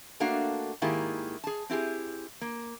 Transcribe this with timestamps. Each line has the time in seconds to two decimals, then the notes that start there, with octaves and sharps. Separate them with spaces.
0.20 A3 A#3 D4 F#4 F5
0.82 G#2 D#3 A#3 E4 G4 G#4
1.44 G#4 A5
1.69 C4 E4 G4 G#4
2.41 A#3